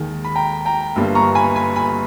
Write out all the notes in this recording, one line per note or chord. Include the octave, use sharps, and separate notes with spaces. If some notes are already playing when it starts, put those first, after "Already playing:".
Already playing: D#2 D#3 G#3
B5
G5 A#5
G5 A#5
G1 G2 G3 A#3
A#5 C#6
G#5 B5
G#5 B5
G#5 B5